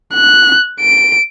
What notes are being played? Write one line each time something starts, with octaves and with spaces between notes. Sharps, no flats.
F#6
D7